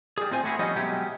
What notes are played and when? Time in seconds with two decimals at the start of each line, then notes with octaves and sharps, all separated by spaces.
0.18 G3 G#4
0.31 A2 C4 F4 C5 G#5
0.44 A3 C4 C#4 E4 F#4 G#4
0.59 F3 G3 B3 C#4 D#4 D#5
0.76 B2 F#3 G#3 A3 C#4 G4